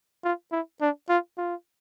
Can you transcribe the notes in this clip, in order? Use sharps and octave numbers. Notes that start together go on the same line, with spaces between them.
F4
E4
D4
F4
F4